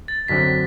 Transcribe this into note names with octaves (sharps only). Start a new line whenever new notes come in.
A6
F#2 D3 F#3 C4 B6